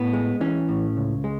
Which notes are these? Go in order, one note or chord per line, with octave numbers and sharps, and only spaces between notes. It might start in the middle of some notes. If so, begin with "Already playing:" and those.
Already playing: A2 B3
G#3
E3 C#4
A2
C#2
G#3